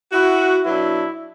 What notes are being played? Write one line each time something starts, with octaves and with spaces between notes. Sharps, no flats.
E4 F#4
B2 F#3 B3 D4 E4